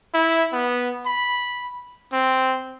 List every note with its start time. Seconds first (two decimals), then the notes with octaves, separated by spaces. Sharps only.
0.14 E4
0.52 B3
1.06 B5
2.13 C4